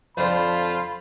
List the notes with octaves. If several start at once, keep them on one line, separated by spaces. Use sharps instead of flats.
F2 D3 F4 C5 B5